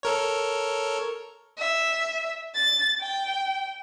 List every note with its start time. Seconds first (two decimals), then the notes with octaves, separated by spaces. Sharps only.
0.03 A4 A#4 C#5
1.58 E5
2.55 A6
3.00 G5